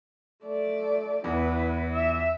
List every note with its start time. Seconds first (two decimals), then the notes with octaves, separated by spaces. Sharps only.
0.44 A3 D5
1.24 E2 E4 B4
1.91 E5